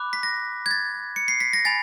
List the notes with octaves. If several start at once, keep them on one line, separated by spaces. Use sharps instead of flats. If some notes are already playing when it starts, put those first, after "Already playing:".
Already playing: B5 D6 F#6
B6
A#6
G#6
A6
C#7
C7
B6
A#6
G#5 B5 A6